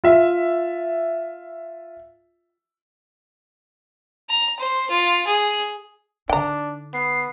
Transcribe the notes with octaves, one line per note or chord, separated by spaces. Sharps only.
F4 E5
A#5
C5
F4
G#4
D3 D4 D#4 G5 A#5
B3 C7